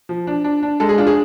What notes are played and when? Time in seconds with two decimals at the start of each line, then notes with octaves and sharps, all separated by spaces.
0.09 F3
0.27 D4
0.44 D4
0.63 D4
0.80 G#3 A4
0.89 G#4
0.98 D4 F4
1.07 G#4